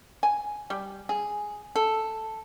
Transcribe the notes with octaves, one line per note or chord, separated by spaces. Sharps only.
G#5
G3
G#4
A4